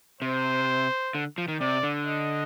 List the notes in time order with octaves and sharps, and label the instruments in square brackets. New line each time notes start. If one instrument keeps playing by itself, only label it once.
[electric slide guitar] C3 [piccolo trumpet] C5
[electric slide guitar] D3
F3
D#3
[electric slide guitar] C3 [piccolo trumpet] D5
[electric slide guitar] D3
[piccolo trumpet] D#5